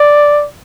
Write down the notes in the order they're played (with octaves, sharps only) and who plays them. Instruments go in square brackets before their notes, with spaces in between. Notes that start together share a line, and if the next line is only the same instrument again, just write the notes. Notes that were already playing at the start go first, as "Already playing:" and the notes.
Already playing: [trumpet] D5